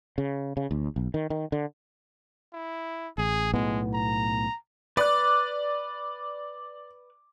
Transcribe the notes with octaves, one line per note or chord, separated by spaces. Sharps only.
C#3
C#3
D2
B1
D#3
D#3
D3
E4
A1 G#4
B1 A2 G#3 B3
A#5
B4 D5 D6 F#6